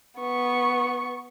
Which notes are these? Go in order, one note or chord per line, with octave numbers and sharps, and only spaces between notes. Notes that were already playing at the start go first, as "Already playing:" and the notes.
B3 C#6